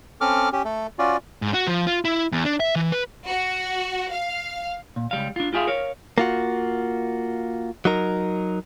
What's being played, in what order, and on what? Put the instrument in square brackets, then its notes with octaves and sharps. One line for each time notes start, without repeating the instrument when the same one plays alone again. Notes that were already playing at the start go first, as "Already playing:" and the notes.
[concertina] C4 C#4 A4 D6 F6
C#4 G4
A3 A4
C#4 F4 F#4 D5
[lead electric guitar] G#2
F#4
F3
F4
E4
E2
D4
E5
E3
B4
[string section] F#4
F5
[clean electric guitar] A#2
C#2 G3 F5
D4 F4
F4 G4 G#4 E5 F5
A#4 C#5 F5
A#3 F4 F#4
F#3 D#4 A#4